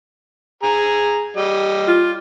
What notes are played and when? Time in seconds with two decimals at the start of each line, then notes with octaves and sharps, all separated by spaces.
0.63 G#4 A#5
1.37 G3 D#5
1.87 F4